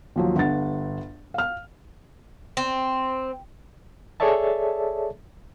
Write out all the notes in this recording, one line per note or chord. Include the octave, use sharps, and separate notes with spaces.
D#2 F3 F#3
G1 G2 F#5 A6
F5 F6
C4
G#4 A4 C#5 D5 E5 A5